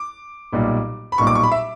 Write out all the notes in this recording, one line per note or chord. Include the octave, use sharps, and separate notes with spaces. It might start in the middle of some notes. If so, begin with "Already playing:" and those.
Already playing: D6
B1 A#2 G3
B5
B1 A#2 G3 C#6
D6
C#6
B5
E5